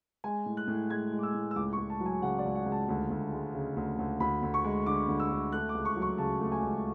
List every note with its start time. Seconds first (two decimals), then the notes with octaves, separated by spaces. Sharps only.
0.24 G#3 G#5
0.46 A2
0.57 F#6
0.68 A2
0.90 G#3 G#6
1.12 G#3
1.19 D6
1.23 E6
1.34 A2
1.51 E6
1.56 C#2 D6
1.73 C#6
1.78 C#2
1.90 A5
2.00 F#3
2.06 G#5
2.22 C#3 F#5
2.39 D5
2.45 C#2
2.55 F#5
2.66 C#2
2.72 A5
2.89 D2
3.10 D2
3.32 G#3
3.54 C#3
3.76 D2
3.99 D2
4.20 D2 B5
4.42 D2
4.54 C#6
4.65 G#3
4.86 D3 D6
5.08 D2
5.20 E6
5.30 D2
5.52 A3 F#6
5.69 D6
5.75 C#2
5.85 C#6
5.96 F#3
6.02 C#6
6.18 C#3 A5
6.41 A3
6.52 G#5
6.63 C#2